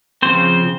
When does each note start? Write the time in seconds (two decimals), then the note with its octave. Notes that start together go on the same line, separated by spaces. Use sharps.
0.22 C#3 F3 C4 C5